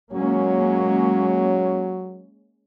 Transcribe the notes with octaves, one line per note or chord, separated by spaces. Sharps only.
F#3 G#3 A#3 C#4